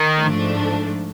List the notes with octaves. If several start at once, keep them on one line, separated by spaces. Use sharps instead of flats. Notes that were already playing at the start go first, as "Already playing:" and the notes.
Already playing: D#3
G#2 F3 A3 D4